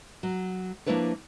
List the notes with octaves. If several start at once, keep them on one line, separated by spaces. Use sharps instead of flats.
F#3
F3 A#3 D4 E4 B4 C#5